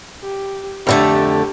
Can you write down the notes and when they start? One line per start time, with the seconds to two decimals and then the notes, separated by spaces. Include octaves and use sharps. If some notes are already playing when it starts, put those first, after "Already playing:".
0.22 G4
0.87 F2 D3 A3 G4